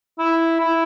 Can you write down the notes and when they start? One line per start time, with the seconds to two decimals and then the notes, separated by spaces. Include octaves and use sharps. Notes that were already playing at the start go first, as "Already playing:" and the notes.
0.19 E4
0.60 E4